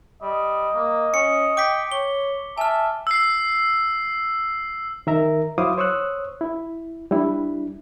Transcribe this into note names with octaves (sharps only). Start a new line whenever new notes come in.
G3 D#5
A#3
C#4 C#7
G5 D6 B6
C#5 G7
E5 G#5 A5 F6
E6 C7
D#3 A#4 E5 A#5
F#3 E4 C5 F5 D6 D#6
C5 C#5 C#6 D#6 E6 F#6
E4
G3 D4 E4